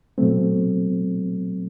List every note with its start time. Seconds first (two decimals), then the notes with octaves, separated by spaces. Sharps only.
0.18 B2 F#3 A3 C4